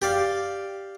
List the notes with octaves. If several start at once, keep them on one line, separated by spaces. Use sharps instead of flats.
G4 D5 F5